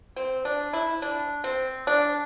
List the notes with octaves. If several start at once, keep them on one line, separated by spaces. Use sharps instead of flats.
C4
D4
E4
D4
C4
D4